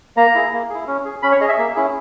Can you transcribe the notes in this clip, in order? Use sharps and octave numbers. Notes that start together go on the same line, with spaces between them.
A#3 A#5
E4 G#4
A#3
E4 G#4
C#4
G#4
C#4 B5
C#5
G#4 D#5
E5
A#3
C#4 E4 G#4